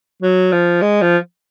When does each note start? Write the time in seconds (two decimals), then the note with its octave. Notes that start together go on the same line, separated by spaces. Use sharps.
0.22 F#3
0.52 F3
0.81 G#3
1.01 F3